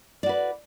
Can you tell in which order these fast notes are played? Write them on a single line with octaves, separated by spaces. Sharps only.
D5 F#4 B4